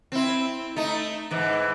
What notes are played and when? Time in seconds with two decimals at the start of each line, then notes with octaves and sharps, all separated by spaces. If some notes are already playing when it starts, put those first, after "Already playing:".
0.12 C4 E4
0.76 A3 D#4
1.31 G#2 E3